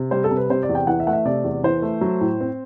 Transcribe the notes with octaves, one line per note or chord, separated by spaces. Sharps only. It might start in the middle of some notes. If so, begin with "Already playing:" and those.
Already playing: C3
G3 C5
A4
C3
B4
C3 C5
D5
E2
G5
E3 F#5
E5
A3 F#5
E5
C3 D5
E2
E3 C5
A3
F#3
A2
C4